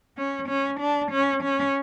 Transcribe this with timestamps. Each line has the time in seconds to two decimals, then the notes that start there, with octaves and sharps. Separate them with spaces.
0.17 C#4
0.48 C#4
0.80 D4
1.12 C#4
1.43 C#4